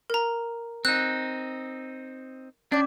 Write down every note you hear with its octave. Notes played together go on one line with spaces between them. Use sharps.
A#4 A#5
C4 D#4 F#6
C#4 D4 D5 D6